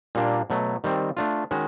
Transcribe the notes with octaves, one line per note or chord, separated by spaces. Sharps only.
A#2 G3 A#3 D4
B2 F#3 A3
D#3 G3 C4
A3 D4 F4
D#3 G#3 C#4 F#4